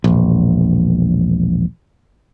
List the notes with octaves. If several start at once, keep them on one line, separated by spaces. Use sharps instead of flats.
E1 A#1